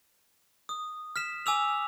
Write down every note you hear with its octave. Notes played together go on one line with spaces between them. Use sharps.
D#6
F6 B6 E7
G#5 D6 E6 F7